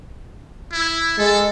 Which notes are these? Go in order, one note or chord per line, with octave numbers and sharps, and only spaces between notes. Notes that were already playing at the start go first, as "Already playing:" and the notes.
E4
G#3 A4